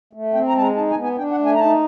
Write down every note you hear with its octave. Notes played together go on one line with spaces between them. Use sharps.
A3
C4 G5
A#5
G#3 A5
A#5
D#4 A5
G#5
B3
G#5
D4 G5
F#5
A3
G#5
A#5
D#4 A5